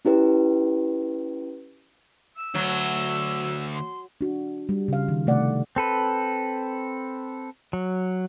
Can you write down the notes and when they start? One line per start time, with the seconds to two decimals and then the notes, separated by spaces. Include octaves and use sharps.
0.05 C#4 E4 G4 B4
2.35 E6
2.55 D2 F#3
3.73 C6
4.21 D4 F#4
4.69 G3
4.88 C#3 F5
5.08 D#3
5.27 C3 A3 D5 F#5
5.76 C4 A4 B4
7.73 F#3